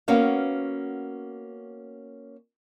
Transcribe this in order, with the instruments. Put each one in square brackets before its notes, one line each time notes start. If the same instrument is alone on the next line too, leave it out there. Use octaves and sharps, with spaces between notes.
[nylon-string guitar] A#3 B3 C#4 F#4 F5